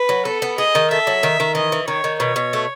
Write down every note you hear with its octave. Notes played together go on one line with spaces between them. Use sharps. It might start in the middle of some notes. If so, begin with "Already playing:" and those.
Already playing: B4
F#3
B3 A4
B3
G#4 D#5
D#3
A4 E5
F#3
D#3
D#3
E3 D#5
E3
D#3 C#5
D#3
B2 C#5
B2
A3